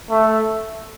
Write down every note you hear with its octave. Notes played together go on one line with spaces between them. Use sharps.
A3